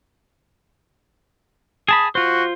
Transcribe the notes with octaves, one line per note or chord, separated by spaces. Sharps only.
G#4 A5 B5 D#6
F4 F#4 C5